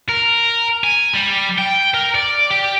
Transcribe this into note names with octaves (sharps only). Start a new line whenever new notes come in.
A#4
G#5
G3
G5
A#4
D5
G4